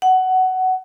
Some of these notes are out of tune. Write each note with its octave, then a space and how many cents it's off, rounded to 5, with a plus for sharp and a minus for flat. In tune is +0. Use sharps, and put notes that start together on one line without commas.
F#5 +15